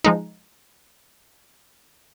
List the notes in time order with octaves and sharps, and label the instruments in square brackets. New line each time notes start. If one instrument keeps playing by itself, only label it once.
[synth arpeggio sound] F3 G#3 D#4